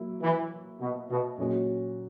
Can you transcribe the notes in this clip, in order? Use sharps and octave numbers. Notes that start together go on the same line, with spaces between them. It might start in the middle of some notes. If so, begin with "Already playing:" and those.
Already playing: F#3 A#3 E4
E3
B2
B2
A#2 F#3 G#3 A#3 C#4 F#4